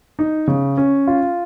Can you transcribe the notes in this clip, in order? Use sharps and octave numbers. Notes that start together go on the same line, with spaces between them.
D#4
C#3
C#4
F4